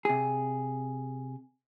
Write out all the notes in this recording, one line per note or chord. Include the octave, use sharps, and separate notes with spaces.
C3 G#4